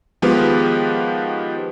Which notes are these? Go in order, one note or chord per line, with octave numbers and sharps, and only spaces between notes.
D#3 F3 G#3 B3 G4 B4